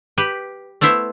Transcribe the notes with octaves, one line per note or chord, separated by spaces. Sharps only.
G4 B4
A3 B3 E4 C5 E5